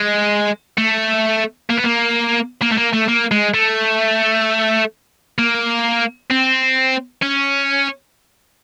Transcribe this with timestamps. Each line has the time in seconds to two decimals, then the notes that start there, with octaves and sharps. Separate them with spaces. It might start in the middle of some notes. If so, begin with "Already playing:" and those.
Already playing: G#3
0.78 A3
1.70 A#3
1.77 B3
1.84 A#3
2.62 A#3
2.72 A3
2.77 A#3
2.93 A3
3.08 A#3
3.31 G#3
3.54 A3
5.38 A#3
6.30 C4
7.22 C#4